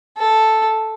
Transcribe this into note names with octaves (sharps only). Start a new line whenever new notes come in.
A4